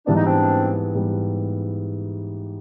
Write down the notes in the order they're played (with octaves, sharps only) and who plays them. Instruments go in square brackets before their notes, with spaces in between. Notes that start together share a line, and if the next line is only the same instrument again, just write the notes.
[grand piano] G#2 E3 G3 B3 [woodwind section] D4
[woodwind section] D#4
C4 D4
[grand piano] G#2 E3 G3 B3